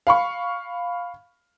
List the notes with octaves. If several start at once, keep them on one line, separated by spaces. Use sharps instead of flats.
F5 B5 C#6